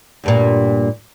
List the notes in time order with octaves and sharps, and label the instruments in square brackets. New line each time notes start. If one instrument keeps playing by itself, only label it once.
[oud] D2 G2 A#2